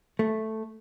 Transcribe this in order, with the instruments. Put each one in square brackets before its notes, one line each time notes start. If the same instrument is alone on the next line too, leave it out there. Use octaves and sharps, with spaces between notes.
[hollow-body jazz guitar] A3